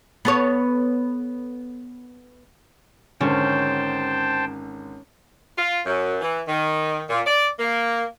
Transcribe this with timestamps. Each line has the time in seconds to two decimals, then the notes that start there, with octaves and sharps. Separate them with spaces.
0.25 B3 A4 C#5
3.21 G#1 D3 C#4 C5 G5 A5
5.58 F4
5.86 F#2
6.21 E3
6.48 D#3
7.10 A#2
7.27 D5
7.59 A#3